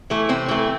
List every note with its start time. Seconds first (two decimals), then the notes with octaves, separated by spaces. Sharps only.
0.10 E3 A3
0.29 C3 C4
0.48 E3 A3